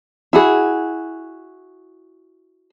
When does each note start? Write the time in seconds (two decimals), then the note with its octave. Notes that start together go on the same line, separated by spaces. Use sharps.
0.33 E4 F#4 G#4